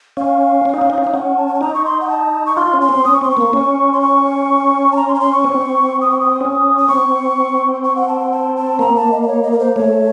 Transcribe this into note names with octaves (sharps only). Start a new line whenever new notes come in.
C#4 F5
C#4
D#4
C#4
D#4
C#4
D#4 F5
C#4 F#5
A5
F#5
A5
D#4 A#5
C#6
C6
F#5
A5
C#6
F4 C6
C#4
C6
C4
C#4 D#6
C#6
C4 C6
C#6
A#3
C#4
C6
C#6
A5
A#5
C6
A#5
C6
C#6
C4
D#6
C#6
D#6
C#4
D#6
C4 C#6
C#6
F#5
A5
F#5
A5
A5
A#3 A#5
A5
D#5
D#5
C#5
D#5
A#4
C5
A3 C#5